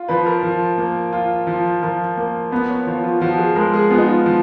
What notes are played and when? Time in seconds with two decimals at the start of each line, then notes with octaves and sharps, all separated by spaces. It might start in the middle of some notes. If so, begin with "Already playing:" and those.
Already playing: F4
0.08 F3 B4
0.26 A#4
0.43 F3
0.78 A#3
1.13 F4
1.47 F3
1.82 F3 A#4
2.17 A#3
2.51 B3 B4
2.69 C#5
2.86 F3 C#5
3.04 F4
3.21 F3 F#4
3.38 G#4
3.55 G#3 A#4
3.73 G#4
3.90 B3 F4
3.98 D#4
4.06 F4
4.26 F3